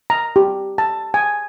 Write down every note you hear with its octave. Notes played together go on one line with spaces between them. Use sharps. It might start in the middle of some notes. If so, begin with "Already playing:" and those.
A#5
G4
A5
G#5